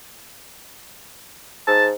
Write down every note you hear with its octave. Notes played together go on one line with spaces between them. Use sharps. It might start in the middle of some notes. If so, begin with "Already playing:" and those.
G#2 A5